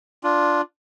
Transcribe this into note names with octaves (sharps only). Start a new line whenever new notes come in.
D4 F4